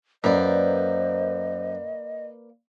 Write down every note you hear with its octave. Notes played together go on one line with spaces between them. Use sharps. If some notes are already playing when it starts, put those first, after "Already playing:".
F#2 A#3 B4 C5 D5 D#5